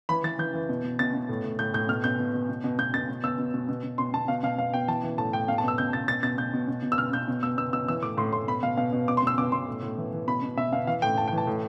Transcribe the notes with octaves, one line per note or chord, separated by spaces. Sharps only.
E3 B5
E3 A6
E3 G6
E3
B2
B2
B2 A6
B2
A2
A2
A2 G6
A2 G6
B2 F6
B2 G6
B2
B2
B2
B2
B2 G6
B2 A6
B2
B2 E6
B2
B2
B2
B2
B2 C6
B2 A5
B2 F5
B2 F5
B2 F5
B2 G5
E3 A5
E3
A2 A5
A2 G5
B2 F5
A5
B2 E6
B2 G6
B2 A6
B2 A6
B2 A6
B2 G6
B2
B2
B2
E6
B2 F6
B2 G6
B2
B2 E6
B2 E6
B2 E6
E3 E6
A2 D6
A2 C6
A2 C6
B2 B5
B2 F5
B2 F5
B2
B2 D6
C6
B2 E6
B2 D6
B2 C6
A2
A2
E3
E3
B2 B5
B2
B2 E5
B2 F5
E3 F5
A2 G5
A2 A5
E3 G5
A5
A2